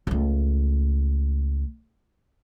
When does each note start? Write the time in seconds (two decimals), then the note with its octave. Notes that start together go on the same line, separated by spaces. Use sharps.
0.07 C#2 A3